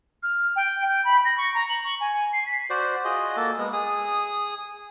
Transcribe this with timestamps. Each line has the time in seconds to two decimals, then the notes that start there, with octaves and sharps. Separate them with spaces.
0.23 F6
0.56 G5
0.88 G6
1.05 B5
1.25 A#6
1.38 C#6
1.54 A#5
1.69 F#7
1.84 C#6
2.00 G#5
2.33 C7
2.46 B6
2.70 F#4 C5 D5
3.05 F4 F#4 G#4 D#5
3.37 A#3 A4
3.58 G#3 B3
3.73 G#4 D#6